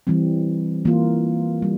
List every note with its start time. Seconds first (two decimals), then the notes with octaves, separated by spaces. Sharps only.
0.07 E3 G3 C4
0.85 E3 A#3 F4
1.62 G3